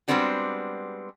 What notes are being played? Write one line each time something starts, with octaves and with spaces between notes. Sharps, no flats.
G3 G#3 B3 C4 D4 F#4